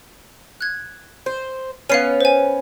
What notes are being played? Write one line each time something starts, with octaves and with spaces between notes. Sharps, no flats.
F#6 G#6
C5
B3 C#4 F5 C7 D#7
C5 G#5